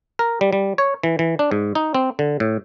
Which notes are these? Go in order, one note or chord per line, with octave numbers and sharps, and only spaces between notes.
A#4
G3
G3
C#5
E3
E3
D4
G#2
D#4
C4
D3
A2